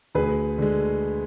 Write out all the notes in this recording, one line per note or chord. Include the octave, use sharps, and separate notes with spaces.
D2 G#4 B4
D3 G#3